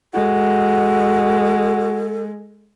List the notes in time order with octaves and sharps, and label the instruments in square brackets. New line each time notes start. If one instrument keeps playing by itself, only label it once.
[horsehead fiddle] G#3 [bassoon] F#4 [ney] A4